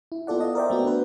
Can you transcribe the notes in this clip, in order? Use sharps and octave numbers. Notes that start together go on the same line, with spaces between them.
E4
B3 F4 A4 D5 F#5
D#5
A#4 C5 D5 E5 G5
A3 B3 F#4
D4 B4